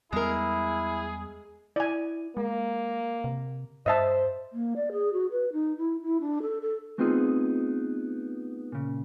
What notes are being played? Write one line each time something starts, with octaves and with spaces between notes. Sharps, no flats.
E2 G3 G#3 B3 E4 G#4 A#4
E4 D5 G#5
G#3 A#3
C3
G2 C5 D#5 E5 A5
A#3
D5
G#4
F#4
B4
D#4
E4
E4
D4
A4
A4
A3 B3 C4 D#4 F4 G#4
A#2 C#3